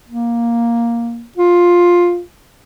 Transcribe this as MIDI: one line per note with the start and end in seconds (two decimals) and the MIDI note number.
0.09 1.25 58
1.37 2.21 65